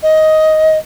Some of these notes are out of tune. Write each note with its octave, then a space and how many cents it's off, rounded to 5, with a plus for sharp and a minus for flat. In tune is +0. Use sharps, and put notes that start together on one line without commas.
D#5 +10